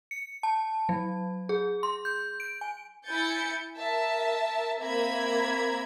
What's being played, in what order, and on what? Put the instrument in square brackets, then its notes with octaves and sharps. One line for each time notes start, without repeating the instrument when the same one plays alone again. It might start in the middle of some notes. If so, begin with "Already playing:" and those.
[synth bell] C#7
A5
F#3
G#4
C6
G6
D7
G#5
[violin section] E4 G#5 G6 A6 C#7
A#4 E5 A5
A#3 C4 E5 A#5 B5 G#6